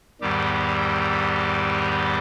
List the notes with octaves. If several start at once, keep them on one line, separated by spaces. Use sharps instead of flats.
E2 G#2 D#3 G3 G4